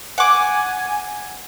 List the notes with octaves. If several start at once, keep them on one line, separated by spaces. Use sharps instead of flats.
F#5 G#5 D6